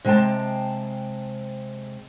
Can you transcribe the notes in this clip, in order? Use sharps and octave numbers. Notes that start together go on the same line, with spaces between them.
C3 G#3 B4 G5 A5